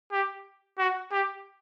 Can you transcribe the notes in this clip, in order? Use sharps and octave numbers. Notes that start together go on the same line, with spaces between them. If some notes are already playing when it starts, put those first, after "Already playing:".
G4
F#4
G4